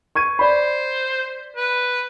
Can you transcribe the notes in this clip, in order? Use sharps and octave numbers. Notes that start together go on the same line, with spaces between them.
C#6 G#6 D#7
C5 D5 B5
B4